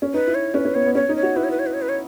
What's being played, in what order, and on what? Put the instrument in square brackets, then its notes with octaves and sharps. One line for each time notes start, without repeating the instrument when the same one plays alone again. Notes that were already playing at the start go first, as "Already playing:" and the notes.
[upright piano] C#4
[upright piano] D#4 [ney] B4
[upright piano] E4
[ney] C#5
[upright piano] C#4 [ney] B4
[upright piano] C#4
[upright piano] B3 [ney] C#5
[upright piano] B3
[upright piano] C#4 [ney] C#5
[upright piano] D#4
[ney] C#5
[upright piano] F#4
[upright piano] E4 [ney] B4
[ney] C#5
B4
C#5
B4
C#5
B4
C#5